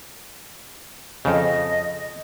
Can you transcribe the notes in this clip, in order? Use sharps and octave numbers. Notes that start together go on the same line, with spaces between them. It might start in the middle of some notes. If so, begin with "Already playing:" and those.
F2 C#3 D#5